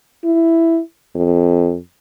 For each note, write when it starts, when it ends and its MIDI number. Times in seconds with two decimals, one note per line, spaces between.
0.25 0.80 64
1.15 1.76 41